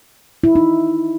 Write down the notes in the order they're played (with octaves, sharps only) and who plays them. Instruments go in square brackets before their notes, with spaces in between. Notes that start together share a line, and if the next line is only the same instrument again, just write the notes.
[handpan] E4
D#4